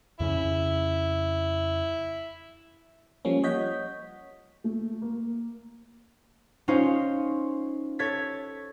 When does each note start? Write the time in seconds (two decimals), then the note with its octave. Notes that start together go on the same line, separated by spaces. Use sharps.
0.20 F2 C#3 C#4 E4
3.25 F3 G3 A#3 C#4
3.44 C#5 D#5 F#5 G6 B6
4.64 A3
5.02 A#3
6.68 C#4 D#4 F4 C5 C#5
7.99 A4 C#5 G#6 A6 B6